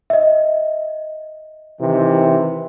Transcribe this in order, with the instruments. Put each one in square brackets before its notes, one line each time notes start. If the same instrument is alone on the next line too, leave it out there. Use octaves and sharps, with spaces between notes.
[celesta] D#5 E5
[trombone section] C3 D#3 E3